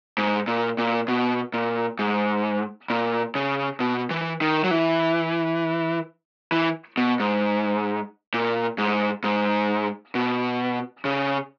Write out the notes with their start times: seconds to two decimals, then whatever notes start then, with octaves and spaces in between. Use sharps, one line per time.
0.18 G#2
0.47 A#2
0.79 A#2
1.08 B2
1.54 A#2
1.99 G#2
2.90 A#2
3.35 C#3
3.80 B2
4.11 E3
4.41 D#3
4.64 F#3
4.71 E3
6.52 E3
6.98 B2
7.20 G#2
8.34 A#2
8.78 G#2
9.24 G#2
10.15 B2
11.05 C#3